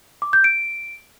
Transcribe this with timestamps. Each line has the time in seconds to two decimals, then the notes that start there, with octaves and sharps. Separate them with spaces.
0.22 D6
0.33 G6
0.44 D7